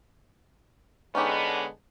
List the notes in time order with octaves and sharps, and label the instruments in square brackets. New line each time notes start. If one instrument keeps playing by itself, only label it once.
[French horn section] D3 G#3 B3 [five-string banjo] C#4 D#4 G4